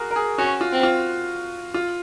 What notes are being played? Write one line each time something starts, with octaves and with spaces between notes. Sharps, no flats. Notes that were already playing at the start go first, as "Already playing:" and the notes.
Already playing: F#4 G#4 A#4
A#4
G#4
C#4 F#4
F4
C4
F4
F4